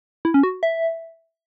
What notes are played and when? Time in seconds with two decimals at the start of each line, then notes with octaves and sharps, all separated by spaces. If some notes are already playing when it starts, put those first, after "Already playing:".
0.25 E4
0.34 C#4
0.43 F#4
0.63 E5